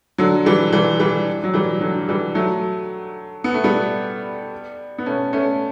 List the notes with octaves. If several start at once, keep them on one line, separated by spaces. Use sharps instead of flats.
D3 F#3
E3 G3
E3 G3
E3 G3
F#3
E3 G3
D3 F#3
E3 G3
F#3 A3
B3
A3
G3 B3
B3
A3 C#4
A3 C#4